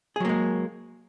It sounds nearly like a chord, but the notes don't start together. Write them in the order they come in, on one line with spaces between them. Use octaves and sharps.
G#4 F#3 A#3 G#3